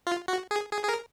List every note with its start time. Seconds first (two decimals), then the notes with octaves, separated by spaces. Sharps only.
0.07 F4
0.28 F#4
0.51 G#4
0.73 G#4
0.83 G#4
0.89 A#4